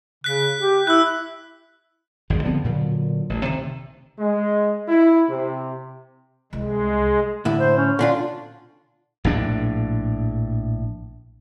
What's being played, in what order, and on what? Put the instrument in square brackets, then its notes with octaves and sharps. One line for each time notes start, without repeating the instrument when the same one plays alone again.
[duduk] C#3 [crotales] F#6 B6
[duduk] G4
[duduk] E4 [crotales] E6 F#6
[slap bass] G#1 F2 D3
D3 F3 B3 C4
A#2 D3 F#3
A1
C3 D#3
[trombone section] G#3
E4
C3
[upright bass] C2 [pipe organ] G#3
[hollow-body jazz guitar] A2 D3 E4
[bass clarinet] C5
C#4
[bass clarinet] A#2 [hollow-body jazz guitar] D3 D4 F4
[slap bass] A#1 A2 D4